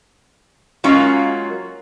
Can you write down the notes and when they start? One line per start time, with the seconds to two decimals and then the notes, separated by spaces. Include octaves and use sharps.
0.84 F#3 G#3 A#3 C#4 F4